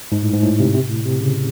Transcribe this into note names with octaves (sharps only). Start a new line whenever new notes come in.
G#2
A2
G#2
A2
C3
C3
A2
C3
C#3